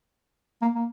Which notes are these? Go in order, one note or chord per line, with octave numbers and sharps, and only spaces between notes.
A#3
A#3